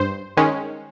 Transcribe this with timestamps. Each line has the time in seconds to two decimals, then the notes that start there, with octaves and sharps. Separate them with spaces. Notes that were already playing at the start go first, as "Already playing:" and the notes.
Already playing: G2 C5
0.37 D#3 G#3 C#4